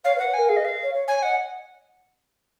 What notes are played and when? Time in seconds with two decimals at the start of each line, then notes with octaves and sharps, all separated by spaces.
0.04 C#5 F5
0.16 B4
0.19 F#5
0.27 B4
0.34 A#4 G#5
0.49 G#4 F5
0.57 D#5
0.60 B4
0.65 F5
0.82 C#5
0.93 C#5
1.08 C#5 G#5
1.23 D#5 F#5